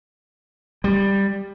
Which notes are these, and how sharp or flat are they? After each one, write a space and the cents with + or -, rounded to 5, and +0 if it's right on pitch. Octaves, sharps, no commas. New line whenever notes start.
G3 +10